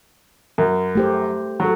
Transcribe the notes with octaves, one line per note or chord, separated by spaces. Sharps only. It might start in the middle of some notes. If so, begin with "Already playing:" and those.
F#2
A3 G4 C5
F#3 A3